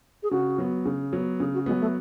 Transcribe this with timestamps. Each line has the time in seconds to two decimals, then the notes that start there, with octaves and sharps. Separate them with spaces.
0.23 G#4
0.31 C#3 F#4
0.58 F#3 B3
0.85 C#3
1.13 F#3 B3
1.40 C#3 G#4
1.54 F#4
1.66 F#3 G#3 B3
1.80 A3